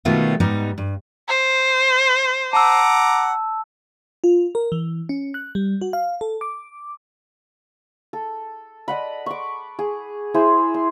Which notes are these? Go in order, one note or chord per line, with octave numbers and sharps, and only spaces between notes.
B2 D#3 G3 A3 B3 F4
G#2 G3 B3 D#4
G2
C5
F#5 A5 A#5 D6 E6
F4
A#4
E3
C#4
F#6
G3
F#4
F5
A4
D6
A4
D5 D#5 F#5 B5
C#6 D6
G#4
E4 G#4 C5
C6